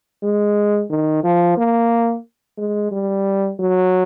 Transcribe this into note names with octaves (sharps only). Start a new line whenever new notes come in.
G#3
D#3
F3
A#3
G#3
G3
F#3